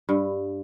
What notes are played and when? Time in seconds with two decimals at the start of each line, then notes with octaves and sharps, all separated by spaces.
0.09 G2